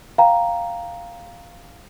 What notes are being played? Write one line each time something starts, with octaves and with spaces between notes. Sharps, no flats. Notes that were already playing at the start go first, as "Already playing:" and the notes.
F5 G5 A#5